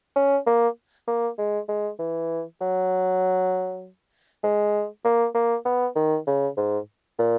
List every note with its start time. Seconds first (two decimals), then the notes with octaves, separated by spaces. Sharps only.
0.16 C#4
0.46 A#3
1.07 A#3
1.38 G#3
1.68 G#3
1.99 E3
2.60 F#3
4.43 G#3
5.04 A#3
5.34 A#3
5.65 B3
5.95 D#3
6.27 C#3
6.57 G#2
7.19 A#2